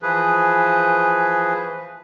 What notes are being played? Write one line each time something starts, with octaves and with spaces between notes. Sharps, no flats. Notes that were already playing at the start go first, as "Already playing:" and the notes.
E3 F3 G#4 B4